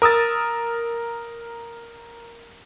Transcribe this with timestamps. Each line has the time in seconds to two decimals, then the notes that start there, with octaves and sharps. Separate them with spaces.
0.02 A#4 D#6 E6 A6